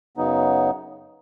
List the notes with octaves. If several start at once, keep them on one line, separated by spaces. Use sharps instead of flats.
F#2 C#3 F#3 B3 D#4